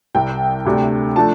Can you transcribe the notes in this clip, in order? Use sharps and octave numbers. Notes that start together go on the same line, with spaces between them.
C2 C3 G3 G5
D2 C3 A3 D4
F3 A3 D4 A5